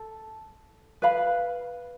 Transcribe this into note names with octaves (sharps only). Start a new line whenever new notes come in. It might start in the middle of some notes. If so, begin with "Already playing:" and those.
Already playing: A4 A5
B4 F5 B5